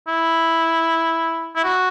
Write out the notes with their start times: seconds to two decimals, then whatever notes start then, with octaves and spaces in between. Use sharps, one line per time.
0.08 E4
1.56 E4
1.64 F#4